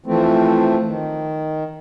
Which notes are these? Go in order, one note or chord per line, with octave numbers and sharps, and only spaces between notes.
E3 F3 A3 C4
D#3